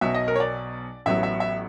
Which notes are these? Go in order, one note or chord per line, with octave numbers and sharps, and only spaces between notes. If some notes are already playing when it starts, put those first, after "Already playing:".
B1 B2 F#3 E5
D#5
A#4
C#5
D5
A1 A2 F#3 B3 E5
E5
E5